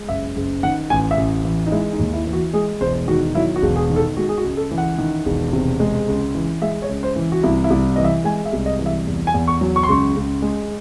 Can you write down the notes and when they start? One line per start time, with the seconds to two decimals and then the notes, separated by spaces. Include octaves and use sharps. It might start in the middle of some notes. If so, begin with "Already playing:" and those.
Already playing: G#3
0.09 F#1 E5
0.36 F#1
0.63 D#3 F#5
0.90 A1 G#5
1.11 E5
1.17 A1
1.45 E3
1.67 D#4
1.72 G#3 E4
1.93 D#4
1.99 D#2
2.13 E4
2.27 E3
2.33 F#4
2.53 G#3 G#4
2.81 E1 C5
3.08 D#3 F#4
3.35 F#3 E4
3.56 F#4
3.62 E1
3.76 G#4
3.90 D#3
3.96 A4
4.17 G#3 F#4
4.29 G#4
4.38 F#4
4.44 C#2
4.57 A4
4.71 E3
4.78 F#5
4.98 D#3
5.26 E1
5.53 C3
5.80 G#3
6.08 C#2
6.35 E3
6.62 G#3 E5
6.82 C#5
6.89 C#2
7.03 C5
7.16 E3
7.32 F#4
7.43 C2 E4
7.64 E4
7.70 C2
7.96 E3 D#5
8.05 E5
8.24 G#3 G#5
8.45 E5
8.53 C2
8.66 D#5
8.79 E3
8.86 E5
9.07 E2
9.27 G#5
9.34 E2
9.48 C#6
9.61 F#3
9.76 C#6
9.83 C6
9.88 C#2 C#6
10.16 C#2
10.42 G#3